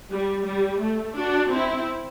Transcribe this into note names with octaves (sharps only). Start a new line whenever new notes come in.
G3
G3
A3
D4 F#4
C4 E4